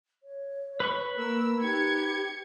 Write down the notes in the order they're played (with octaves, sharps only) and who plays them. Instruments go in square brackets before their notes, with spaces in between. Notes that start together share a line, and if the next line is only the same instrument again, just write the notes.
[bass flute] C#5
[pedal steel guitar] B4 B5 C#6
[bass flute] A#3 [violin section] A#4 E6
[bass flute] D#4 [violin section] G4 G#6 C#7